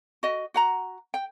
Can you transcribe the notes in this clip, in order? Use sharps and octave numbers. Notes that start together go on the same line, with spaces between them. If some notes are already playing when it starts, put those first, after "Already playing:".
F#4 D#5
F#4 F#5 A#5
G5